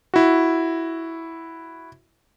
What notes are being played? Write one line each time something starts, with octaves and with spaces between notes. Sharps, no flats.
E4 F#4